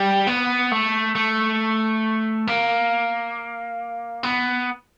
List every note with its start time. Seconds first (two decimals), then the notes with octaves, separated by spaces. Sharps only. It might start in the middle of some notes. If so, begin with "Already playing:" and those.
Already playing: G3
0.27 B3
0.72 A3
1.15 A3
2.47 A#3
4.23 B3